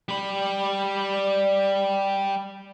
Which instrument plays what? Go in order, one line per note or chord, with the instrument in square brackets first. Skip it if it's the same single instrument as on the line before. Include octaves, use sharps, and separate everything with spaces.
[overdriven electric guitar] G3 B5